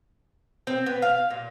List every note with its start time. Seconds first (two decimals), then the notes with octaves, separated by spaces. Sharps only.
0.67 C4
0.86 B3
1.02 F5
1.30 A#2